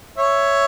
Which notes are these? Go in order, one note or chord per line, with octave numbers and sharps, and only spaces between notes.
C#5 E5